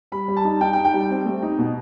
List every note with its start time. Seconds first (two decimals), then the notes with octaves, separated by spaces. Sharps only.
0.12 G3 B5
0.28 G3
0.37 A5
0.45 D#4
0.61 D#4 G5
0.73 G5
0.77 D#4
0.85 G5
0.94 G3
1.09 C4
1.26 A3
1.42 D#4
1.59 B2